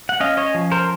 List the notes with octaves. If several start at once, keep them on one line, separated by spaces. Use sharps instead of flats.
F#5
C#4 D#5 F5
C#5 D#5
F3
A#4 C5